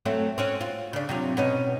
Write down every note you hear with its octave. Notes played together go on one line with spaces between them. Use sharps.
F#3 A3 C4
C4 C#4 F#4
F4
C#3 D4
C3 F#3 F4
B2 C#4 D#4